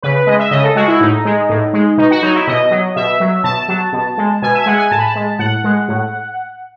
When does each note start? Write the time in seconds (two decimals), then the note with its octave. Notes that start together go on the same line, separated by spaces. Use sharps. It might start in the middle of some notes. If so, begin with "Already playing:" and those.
0.02 C#3 B4
0.15 B4
0.27 G#3 D#5
0.39 E5
0.51 C#3 D#5
0.63 A4
0.75 G#3 F#4
0.88 E4
1.01 A2 D#4
1.25 G#3
1.49 A2
1.73 G#3
1.97 B2 D#4
2.11 F#4
2.22 F#3 D#4
2.35 E4
2.47 B2 D#5
2.71 F#3
2.96 B2 E5
3.20 F#3
3.44 B2 A5
3.68 F#3
3.93 B2
4.18 G#3
4.42 B2 G#5
4.54 E5
4.62 G#5
4.66 G#3 F#5
4.78 G#5
4.91 A2 A5
4.98 B5
5.06 A5
5.15 G#3
5.39 A2 F#5
5.64 G#3
5.88 A2